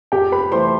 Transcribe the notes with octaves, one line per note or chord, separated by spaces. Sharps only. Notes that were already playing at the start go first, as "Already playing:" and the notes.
F2 G4 G5
B4 B5
E3 A3 C5 C6